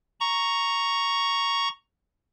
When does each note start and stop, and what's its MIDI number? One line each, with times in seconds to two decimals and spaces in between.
0.20 1.68 82
0.20 1.68 85